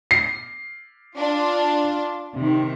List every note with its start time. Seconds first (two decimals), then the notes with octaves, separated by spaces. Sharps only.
0.11 C7
1.17 D4 F4
2.35 C3 D#3